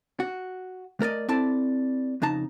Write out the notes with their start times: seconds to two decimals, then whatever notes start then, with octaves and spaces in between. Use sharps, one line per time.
0.20 F#4
1.00 A3 A#4 D5 D#5
1.29 C4 E4 A4 D5 A5
2.22 F2 C#3 D#4 A5 A#5